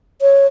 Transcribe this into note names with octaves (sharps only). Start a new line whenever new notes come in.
C#5